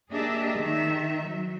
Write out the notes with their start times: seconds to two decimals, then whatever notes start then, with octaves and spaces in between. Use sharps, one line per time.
0.12 A#3 D4 G4 G#4 D#5 E5
0.57 D#3 E5
1.27 F#3